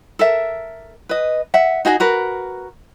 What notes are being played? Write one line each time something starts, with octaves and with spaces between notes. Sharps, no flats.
A4 A#4 E5
B4 D#5
E5 F#5
D#4 F#4 G#4 D#5
F#4 A#4 B4